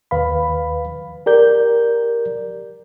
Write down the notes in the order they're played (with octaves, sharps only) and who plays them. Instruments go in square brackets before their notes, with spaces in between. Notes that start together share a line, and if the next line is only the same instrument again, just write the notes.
[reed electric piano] D#2 B4 F5 B5
G4 A#4 D5 G6